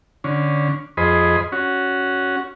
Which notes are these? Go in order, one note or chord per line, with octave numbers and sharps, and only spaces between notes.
D3 C#4
F2 G#4 C5 D#5 B5
C#4 F#4